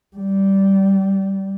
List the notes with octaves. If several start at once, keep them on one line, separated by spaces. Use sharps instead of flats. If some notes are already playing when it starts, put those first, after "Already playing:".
G3